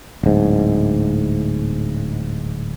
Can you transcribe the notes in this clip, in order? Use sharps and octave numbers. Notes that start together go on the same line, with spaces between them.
D1 G#2